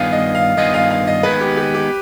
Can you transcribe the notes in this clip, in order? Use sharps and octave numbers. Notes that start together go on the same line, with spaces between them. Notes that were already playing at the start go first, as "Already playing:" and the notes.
Already playing: G2 D#3 B3 F4 G#4 F5
D#5
F5
G2 D#3 B3 F4 G#4 D#5
F5
F5
D#5
D#3 G#3 B3 B4
G4
G4
G4